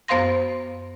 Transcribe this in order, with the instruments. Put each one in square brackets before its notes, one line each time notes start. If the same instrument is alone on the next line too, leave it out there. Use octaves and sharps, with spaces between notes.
[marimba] F#2 B3 C5 F5 C6 A#6